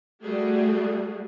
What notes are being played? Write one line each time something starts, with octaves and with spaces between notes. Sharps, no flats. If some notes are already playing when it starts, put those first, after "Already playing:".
G3 A3 F#4 G#4